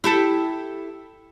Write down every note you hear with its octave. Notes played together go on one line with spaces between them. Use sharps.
E4 G4 A4